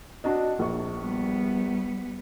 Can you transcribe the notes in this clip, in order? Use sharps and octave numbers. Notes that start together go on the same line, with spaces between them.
D4 F#4 D#5
A#1 C#6
G3 B3